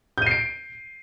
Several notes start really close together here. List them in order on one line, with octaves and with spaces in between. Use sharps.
G6 D#7 C7 D7